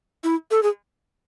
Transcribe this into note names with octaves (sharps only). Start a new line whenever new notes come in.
E4
A4
G#4